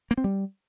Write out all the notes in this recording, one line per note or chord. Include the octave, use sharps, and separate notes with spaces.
A#3
C4
G3